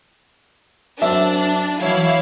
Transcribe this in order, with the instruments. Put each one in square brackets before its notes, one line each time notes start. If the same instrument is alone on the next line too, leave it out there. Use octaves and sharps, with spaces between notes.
[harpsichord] F#2 C4 F5 [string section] D4 [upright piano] E5
[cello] E3 C#5 [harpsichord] F#3 [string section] E4 F5